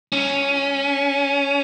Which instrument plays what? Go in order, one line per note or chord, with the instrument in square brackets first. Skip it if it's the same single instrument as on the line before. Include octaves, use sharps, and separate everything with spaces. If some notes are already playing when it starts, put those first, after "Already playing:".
[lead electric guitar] C#4